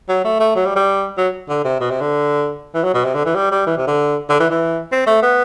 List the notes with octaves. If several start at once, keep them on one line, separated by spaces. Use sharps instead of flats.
F#3
A3
A3
F#3
G3
G3
F#3
D3
C3
B2
C3
D3
E3
F#3
B2
C3
D3
E3
G3
G3
E3
C3
D3
D3
E3
E3
C4
A3
B3